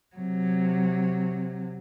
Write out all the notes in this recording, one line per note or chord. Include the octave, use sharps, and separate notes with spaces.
C3 F#3